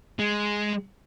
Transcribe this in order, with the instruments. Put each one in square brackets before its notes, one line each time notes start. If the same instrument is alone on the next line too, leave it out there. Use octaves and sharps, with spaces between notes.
[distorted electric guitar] G#3